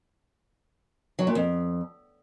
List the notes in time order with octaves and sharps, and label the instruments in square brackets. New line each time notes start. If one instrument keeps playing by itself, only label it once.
[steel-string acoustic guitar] F#3
A#2
F2